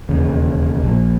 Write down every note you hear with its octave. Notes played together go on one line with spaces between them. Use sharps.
E1 D#2 C#3
A#1 A#2